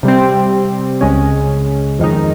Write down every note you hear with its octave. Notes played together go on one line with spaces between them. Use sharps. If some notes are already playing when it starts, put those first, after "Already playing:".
C3 G3 C4
C#2 C#3 G#3 C#4
F2 D#3 G#3 D#4